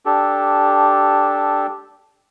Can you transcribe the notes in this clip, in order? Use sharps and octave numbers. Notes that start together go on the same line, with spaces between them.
D4 G4 A4